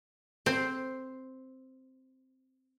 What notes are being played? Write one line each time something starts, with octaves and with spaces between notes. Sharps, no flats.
C4 C5